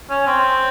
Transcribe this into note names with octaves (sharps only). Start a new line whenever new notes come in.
C#4
C4